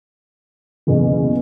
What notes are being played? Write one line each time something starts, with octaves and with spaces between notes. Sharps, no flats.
F#1 E2 B2